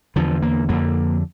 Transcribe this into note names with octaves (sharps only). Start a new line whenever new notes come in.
E2 D3 F3
A#3
F2 D3 A#3